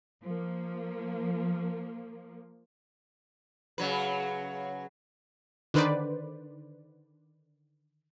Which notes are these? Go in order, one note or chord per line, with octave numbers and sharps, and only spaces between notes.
F3 A#3
C#3 F#3 B4
D3 D#3 B4 C5 D5